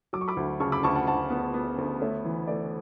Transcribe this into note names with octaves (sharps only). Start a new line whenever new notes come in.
F#3 D6
C#6
B5 D6
D2
C#3 A5 C#6
B5 D6
D2 A5 C#6
F#5 A5
D2 F#5 A5
B3
B3
D2
A3 C#5 E5
E3
A3 B4 D5